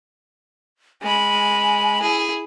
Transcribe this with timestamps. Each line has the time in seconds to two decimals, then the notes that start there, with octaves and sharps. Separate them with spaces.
1.02 G#3 G#5 B5
2.02 E4 G#4